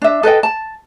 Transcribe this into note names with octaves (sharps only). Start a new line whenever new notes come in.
D4 E5
A4 B4 D#5 G5
A5